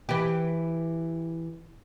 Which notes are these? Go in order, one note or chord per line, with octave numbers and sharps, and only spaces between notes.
E3 G4